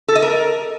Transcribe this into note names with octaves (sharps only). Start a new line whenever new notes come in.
A4
D#5
A#4